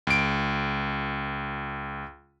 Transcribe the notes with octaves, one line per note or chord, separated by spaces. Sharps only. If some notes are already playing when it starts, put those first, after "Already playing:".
C#2 D7